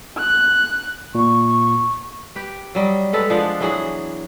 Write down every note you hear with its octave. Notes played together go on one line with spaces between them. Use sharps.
F#6
A#2 C#6
G4 B4
F#3 G3 D#5
G#3 A4 B4 F#5
F3 G#3 B3 D4
E3 F#3 G#4 F#5